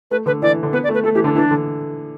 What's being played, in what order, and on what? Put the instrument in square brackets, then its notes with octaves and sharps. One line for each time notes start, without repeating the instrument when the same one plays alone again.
[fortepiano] A3 [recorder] B4
[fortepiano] D3 [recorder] B4
[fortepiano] E3 [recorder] D5
[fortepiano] D3
[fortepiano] B3 [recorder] B4
[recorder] D5
[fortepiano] A3
[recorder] B4
[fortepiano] A3 [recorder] A4
[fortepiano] E3 [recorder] G4
[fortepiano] D3 [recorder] D4
[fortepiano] E3 [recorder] D4
[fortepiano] D3